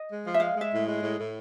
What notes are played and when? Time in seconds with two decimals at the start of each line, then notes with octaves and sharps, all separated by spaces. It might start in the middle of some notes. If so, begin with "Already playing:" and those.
Already playing: D#5
0.10 G#3
0.24 F3
0.34 E5
0.39 G#3 F5
0.55 G#3
0.61 E5
0.72 A2
0.87 G#3
1.02 A2
1.17 A2